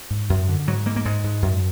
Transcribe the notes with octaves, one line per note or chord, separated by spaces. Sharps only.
G#2
F#2
D3
G#2 F#3
G#2 A#3
A#3
G#2 G#3
G#2
F#2